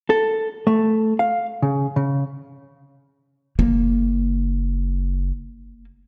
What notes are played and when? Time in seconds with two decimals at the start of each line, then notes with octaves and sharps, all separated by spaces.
0.10 A4
0.67 A3
1.19 F5
1.62 C#3
1.96 C#3
3.59 F#1 A#3